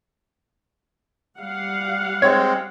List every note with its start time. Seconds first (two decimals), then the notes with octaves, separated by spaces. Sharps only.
1.38 G3 F5 F#5
2.22 G#3 C4 C#5